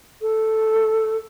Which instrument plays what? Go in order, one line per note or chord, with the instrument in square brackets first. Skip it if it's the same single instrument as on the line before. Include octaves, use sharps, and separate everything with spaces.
[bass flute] A4